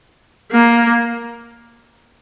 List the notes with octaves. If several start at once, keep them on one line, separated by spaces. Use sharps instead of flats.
A#3